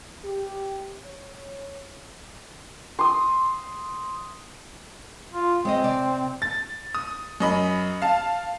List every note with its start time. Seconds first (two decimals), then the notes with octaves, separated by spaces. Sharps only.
0.24 G4
1.03 C#5
2.99 C6 D#6
5.34 F4
5.65 G#3 C4 C#5 D#5
5.84 C3 D5
6.42 A6
6.95 D#6
7.40 F#2 D#5 B5
8.02 F5 A5